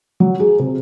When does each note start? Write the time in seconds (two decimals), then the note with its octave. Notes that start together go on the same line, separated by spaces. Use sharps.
0.20 F#3
0.40 G#4
0.59 C3